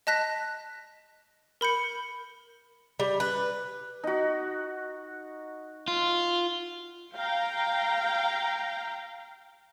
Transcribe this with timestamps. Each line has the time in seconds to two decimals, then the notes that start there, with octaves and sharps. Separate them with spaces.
0.07 D#5 A5 F#6 A#6 B6
1.61 A#4 B5 G6 C#7
3.00 G3
3.20 B4
4.04 D#4 F#4
5.88 F4
7.13 F5 G5 A#5